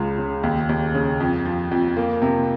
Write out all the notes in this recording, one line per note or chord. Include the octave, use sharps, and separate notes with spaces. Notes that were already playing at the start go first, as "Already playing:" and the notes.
Already playing: C#2 C#3
C#3
D#2
D#2
C#3
F2
F3
F2
A#3
C3